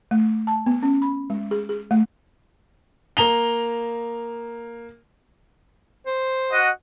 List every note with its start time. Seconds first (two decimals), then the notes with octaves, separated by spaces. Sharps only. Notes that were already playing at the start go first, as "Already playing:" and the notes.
0.11 A3
0.47 A5
0.66 B3
0.83 C#4
1.02 B5
1.30 G#3
1.51 G#4
1.69 G#4
1.91 A3
3.17 A#3 A#5 F7 G7
6.06 C5
6.51 F#4 D#5 F#5